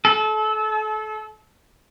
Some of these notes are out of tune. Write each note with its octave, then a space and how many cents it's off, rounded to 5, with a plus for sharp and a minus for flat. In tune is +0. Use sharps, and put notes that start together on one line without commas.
A4 -30